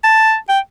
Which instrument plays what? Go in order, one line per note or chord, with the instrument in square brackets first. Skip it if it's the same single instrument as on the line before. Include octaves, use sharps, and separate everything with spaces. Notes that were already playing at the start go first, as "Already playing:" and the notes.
[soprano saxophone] A5
G5